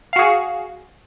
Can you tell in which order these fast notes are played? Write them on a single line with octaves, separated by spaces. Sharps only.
F5 F#4 G#4